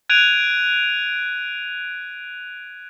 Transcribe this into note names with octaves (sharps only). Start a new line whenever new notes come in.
F#6 G#6 D7 D#7 F7